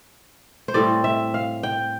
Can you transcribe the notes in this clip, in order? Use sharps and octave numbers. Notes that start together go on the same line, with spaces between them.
C5
A2 G3 C4 D5
E5
F5
G5